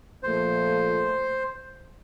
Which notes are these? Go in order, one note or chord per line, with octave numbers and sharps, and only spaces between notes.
A#2 F3 A3 C5